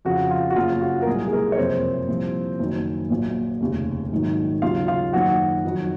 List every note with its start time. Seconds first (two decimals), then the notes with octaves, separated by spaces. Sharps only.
0.05 F2 C#3 F3 F#4
0.31 F4
0.50 F#4
0.56 F#1 F2 C#3 F3 F4
0.81 F#4
1.02 A#4
1.07 C2 A#2 F#3 G#3 G#4
1.28 G#4
1.33 A#3 A#4
1.52 C#5
1.58 F#1 F2 C3 C4 C5
2.08 C2 A#2 F3
2.59 F#1 F#2 D#3 F#3
3.10 A#1 A#2 F#3
3.61 F1 D#2 C#3
4.11 A#1 G#2 D#3 F#3
4.62 D#2 C#3 F#3 F4 F5
4.88 F4 F5
5.13 F#1 F#2 D#3 F#3 F#4 F#5
5.65 F2 D#3 F#3